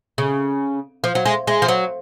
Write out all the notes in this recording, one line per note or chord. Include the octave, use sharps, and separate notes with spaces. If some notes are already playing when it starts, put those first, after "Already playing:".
C#3
F3
F#3
G#3
G#3
F3
F#3